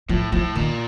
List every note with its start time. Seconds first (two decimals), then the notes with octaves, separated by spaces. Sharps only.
0.09 A2 F3
0.32 A2 F3
0.55 A#2 D#3